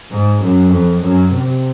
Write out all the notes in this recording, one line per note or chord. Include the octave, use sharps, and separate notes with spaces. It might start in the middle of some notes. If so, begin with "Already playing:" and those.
G#2
F#2
F2
F#2
C3